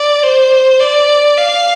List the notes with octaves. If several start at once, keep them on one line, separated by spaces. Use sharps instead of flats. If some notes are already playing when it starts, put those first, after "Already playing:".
Already playing: D5
C5
D5
F5